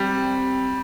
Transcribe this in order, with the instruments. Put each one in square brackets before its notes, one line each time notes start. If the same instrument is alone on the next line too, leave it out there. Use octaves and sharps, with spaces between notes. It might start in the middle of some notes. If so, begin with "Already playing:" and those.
Already playing: [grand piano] G3 [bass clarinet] C4